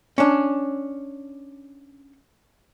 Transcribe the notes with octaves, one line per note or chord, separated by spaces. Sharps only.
C#4 D4